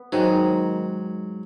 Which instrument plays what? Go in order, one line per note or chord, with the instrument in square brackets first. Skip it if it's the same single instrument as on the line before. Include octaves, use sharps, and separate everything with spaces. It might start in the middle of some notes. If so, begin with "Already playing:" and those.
Already playing: [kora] B3
[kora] G#2 D#3 G#3 D#4 [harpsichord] F#3